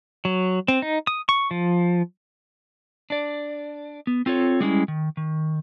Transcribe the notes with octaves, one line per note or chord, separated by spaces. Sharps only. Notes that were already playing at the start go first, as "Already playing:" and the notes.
F#3
C4
D#4
D#6
C#6
F3
D4 D5
B3
C4 F4 A4 C#5
G3 G#3 C#4 E4
D#3
D#3